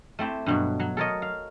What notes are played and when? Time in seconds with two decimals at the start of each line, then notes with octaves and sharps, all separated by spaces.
0.19 A3 C4 E4 G4
0.46 G2 B2 F#3
0.80 F#3
0.97 A4 A#4 C#5 D#5
1.22 F5